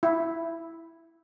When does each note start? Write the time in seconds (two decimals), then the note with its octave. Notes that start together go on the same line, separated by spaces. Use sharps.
0.03 E4